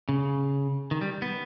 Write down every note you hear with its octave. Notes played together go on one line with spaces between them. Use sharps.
C#3
D#3
G3
B3